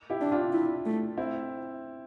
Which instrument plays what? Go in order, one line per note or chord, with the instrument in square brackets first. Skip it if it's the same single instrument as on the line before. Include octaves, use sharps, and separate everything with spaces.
[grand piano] E4 G4
[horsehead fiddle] D4
[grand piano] D4 F4
[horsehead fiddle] E4
A3
[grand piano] C4 E4